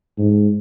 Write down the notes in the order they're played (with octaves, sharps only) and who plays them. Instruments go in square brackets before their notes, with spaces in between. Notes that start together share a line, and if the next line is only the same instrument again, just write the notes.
[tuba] G#2